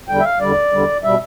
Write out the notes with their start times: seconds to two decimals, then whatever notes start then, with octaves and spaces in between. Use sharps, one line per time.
0.08 E2 D3 G3 G5
0.20 E5
0.24 F5
0.40 E2 D3 G3 D5
0.73 E2 D3 G3
1.04 B2 G3 E5